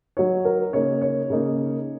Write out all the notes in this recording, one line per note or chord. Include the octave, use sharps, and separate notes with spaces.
F#3 D#4 C#5
A#4
C#3 A#3 D#4 C#5
C#5
C#3 A#3 D#4